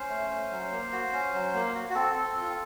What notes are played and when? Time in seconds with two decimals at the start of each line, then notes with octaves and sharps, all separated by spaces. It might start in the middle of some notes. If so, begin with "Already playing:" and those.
Already playing: C#4 C5
0.09 A3
0.30 C#4
0.51 F#3
0.71 A#3
0.92 F#4
1.13 C#4
1.33 F#3
1.54 A#3
1.74 F#4
1.90 F#4
1.95 C4 A4
2.16 C4
2.36 F4